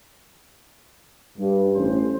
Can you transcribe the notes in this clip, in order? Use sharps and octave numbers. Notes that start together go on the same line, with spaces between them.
G2
A1 C#4 C5